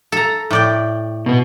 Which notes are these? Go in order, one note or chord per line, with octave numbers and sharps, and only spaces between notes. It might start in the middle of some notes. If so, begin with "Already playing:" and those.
A4 A#5
A2 D5 G5
B2 B3